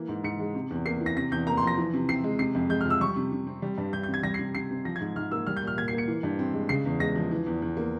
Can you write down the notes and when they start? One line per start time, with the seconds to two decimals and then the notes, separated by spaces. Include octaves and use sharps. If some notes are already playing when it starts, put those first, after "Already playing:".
Already playing: E3 A#3
0.08 G#2
0.24 G#2 C#7
0.39 G#3
0.55 C3
0.70 E2
0.86 A#3 C7
1.01 E3
1.06 A#6
1.17 C3 A#6
1.31 E2 G6
1.47 A#3 A#5
1.57 C6
1.62 F3 A#6
1.78 E3
1.94 C3
2.09 C4 C7
2.24 G#3
2.39 C3 C7
2.55 F2
2.69 G#3 G6
2.81 F6
2.85 F3
2.90 E6
3.01 G3 C#6
3.16 C3
3.32 C3
3.47 C4
3.62 G3
3.78 G2
3.93 G2 G6
4.03 G6
4.08 C4
4.14 G#6
4.23 G3 A#6
4.34 C7
4.39 C3
4.55 C3 C7
4.70 C4
4.85 F3 A#6
4.96 G#6
5.00 G#2
5.16 G#2 F6
5.31 A#3 E6
5.47 G3 F6
5.57 G6
5.62 A#2 F6
5.78 A#2 G#6
5.88 C7
5.93 A#3
5.98 C#7
6.08 E3
6.23 G2
6.39 C4
6.54 G#3
6.69 C#3 C7
6.85 E2
7.00 G#3 A#6
7.16 F3
7.31 E3
7.46 E2
7.62 E2
7.77 A#3